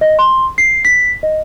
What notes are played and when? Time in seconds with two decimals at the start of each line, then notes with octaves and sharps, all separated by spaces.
0.01 D#5
0.19 C6
0.58 C7
0.85 B6
1.23 D#5